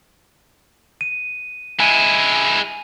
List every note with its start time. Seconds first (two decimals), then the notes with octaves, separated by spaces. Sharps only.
1.01 D#7
1.80 G#3 E4 G#5 D#7